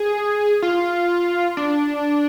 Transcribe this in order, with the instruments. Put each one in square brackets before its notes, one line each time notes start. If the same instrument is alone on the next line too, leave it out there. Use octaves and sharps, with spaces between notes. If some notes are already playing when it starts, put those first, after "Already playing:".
Already playing: [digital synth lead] G#4
F4
D4